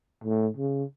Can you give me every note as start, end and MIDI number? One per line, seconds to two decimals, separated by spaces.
0.24 0.47 45
0.57 0.84 49